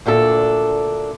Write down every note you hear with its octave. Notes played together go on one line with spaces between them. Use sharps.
D2 A#2 D4 A4